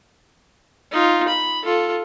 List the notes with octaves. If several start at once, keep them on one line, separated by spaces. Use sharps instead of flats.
D#4 F4
B5
F4 A4